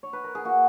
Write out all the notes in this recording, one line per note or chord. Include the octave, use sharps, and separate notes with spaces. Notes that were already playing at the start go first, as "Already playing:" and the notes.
C#5
B4
A#4
G#4
A#3 F#4